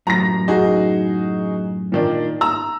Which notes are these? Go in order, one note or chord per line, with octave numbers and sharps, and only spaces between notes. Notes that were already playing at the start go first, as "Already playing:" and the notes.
F#2 A2 A#5 A#6
D#4 F#4 G#4
A#2 D#3 D4
A#5 E6